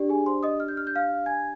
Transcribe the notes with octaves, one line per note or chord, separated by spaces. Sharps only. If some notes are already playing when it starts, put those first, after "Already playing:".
Already playing: D4 G4 D5
G#4 G#5
C5 C6
D#5 D#6
F6
G6
F6
G6
F5 F6
G#5 G#6